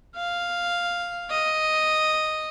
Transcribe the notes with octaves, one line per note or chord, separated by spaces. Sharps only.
F5
D#5